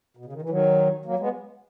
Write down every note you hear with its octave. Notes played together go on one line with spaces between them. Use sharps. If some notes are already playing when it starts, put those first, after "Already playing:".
B2
C#3
D#3
E3
D#3 F#3
F#3 A#3
G#3 B3